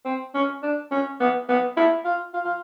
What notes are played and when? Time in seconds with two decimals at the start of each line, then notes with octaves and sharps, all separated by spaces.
0.05 C4
0.35 C#4
0.63 D4
0.91 C#4
1.20 B3
1.49 B3
1.77 E4
2.05 F4
2.34 F4
2.45 F4